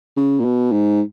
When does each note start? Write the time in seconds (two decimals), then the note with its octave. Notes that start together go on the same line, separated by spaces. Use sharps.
0.17 C#3
0.40 A#2
0.45 B2
0.72 G#2